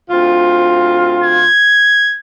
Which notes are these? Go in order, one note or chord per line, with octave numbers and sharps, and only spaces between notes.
D2 C4 F4
G#6